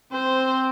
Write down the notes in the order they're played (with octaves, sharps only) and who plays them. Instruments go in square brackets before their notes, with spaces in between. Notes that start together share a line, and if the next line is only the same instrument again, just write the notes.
[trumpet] C4 [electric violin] C5